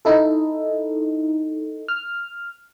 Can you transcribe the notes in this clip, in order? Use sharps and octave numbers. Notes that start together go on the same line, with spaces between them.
D#4 E4 A4
F6